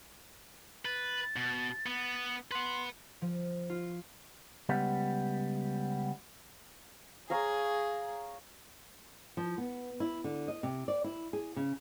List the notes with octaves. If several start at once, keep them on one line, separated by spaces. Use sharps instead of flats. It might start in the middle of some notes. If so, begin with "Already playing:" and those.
B4 A6
B2
B3
B4 F#5 C6
F3
F4
C#2 G3 B3
G#4 C#5 F5 A#5
F3
B3
E4
D3
D#5
C3
D5
E4
G#4
C#3